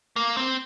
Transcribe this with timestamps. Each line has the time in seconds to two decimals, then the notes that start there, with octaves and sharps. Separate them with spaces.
0.16 A#3
0.37 C4